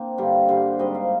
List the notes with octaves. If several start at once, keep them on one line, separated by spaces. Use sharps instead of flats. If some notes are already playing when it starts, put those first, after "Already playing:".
Already playing: A#3 C4 D4
G2 D3 G3 F4
G2 D3 G3 C5
G#2 G3 C4 D#5
F5